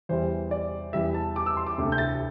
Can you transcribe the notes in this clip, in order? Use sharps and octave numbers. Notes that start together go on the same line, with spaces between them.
E2 E3 G3 C5
D5
E2 E3 G3 E5
A5
D6
E6
C6
D6
D2 C3 A3
G6
A6